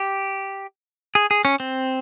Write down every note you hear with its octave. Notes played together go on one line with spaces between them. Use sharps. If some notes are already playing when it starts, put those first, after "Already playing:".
Already playing: G4
G#4
G#4
C#4
C4